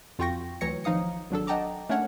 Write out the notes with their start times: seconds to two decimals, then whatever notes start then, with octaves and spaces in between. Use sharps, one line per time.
0.19 F2 F4 F#4 G5 C#6 A#6
0.61 D2 E3 F#3 C#5 A#6 C#7
0.84 G#1 F3 D#4 F5 D#6 C#7
1.30 G#1 F#3 D4 A4
1.47 D#5 F#5 G5 A5 A#5 D6
1.89 A3 C#4 D4 A#4 C#5 F#5